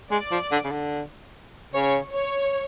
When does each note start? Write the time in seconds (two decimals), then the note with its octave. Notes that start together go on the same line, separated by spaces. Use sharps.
0.11 G#3 D5
0.32 F3
0.52 D3
0.64 C#3
0.72 D3
1.73 C#3 C#5
2.13 C#5